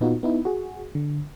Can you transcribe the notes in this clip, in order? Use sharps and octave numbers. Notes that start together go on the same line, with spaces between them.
A#2 B3 D#4 F4 F#4
B3 D#4 E4
F#4 G#4
D3